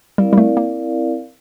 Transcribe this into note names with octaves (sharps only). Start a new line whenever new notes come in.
G3 C4 E4 A#4 D5 F5
G3
A3
A#3